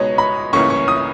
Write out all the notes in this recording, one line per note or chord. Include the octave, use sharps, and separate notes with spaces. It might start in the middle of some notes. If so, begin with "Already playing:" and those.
Already playing: C#2 B2 G#3 B3 D#4 C#5
B5
C#2 C#3 E3 A#3 C#4 C#6
C#6
D#6